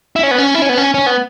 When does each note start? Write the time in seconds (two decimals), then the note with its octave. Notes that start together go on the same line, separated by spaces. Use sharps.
0.16 E4
0.23 C#4
0.31 B3
0.38 C#4
0.54 E4
0.62 C#4
0.69 B3
0.77 C#4
0.94 C#4
1.06 B3